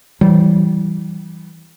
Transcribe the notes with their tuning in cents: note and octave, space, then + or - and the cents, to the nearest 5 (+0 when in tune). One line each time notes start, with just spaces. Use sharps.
E3 +0 G3 -25